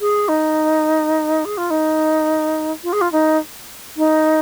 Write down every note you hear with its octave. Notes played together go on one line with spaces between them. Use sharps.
G#4
D#4
G#4
F4
D#4
F4
G#4
F4
D#4
D#4